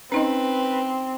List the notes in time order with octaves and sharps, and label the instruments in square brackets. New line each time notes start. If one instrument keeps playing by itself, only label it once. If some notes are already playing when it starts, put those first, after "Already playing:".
[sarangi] C4 [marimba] C#4 D#4 D#5 [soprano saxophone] B4